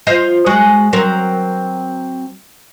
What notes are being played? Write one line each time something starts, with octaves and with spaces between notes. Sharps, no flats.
F4 C5 D#5
G#3 F#4
F#3 C4 A#4